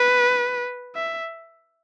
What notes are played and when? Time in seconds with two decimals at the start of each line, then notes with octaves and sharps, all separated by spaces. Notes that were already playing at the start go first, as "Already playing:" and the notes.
Already playing: B4
0.96 E5